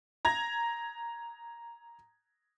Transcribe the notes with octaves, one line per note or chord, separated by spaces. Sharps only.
A#5 G#6 A#6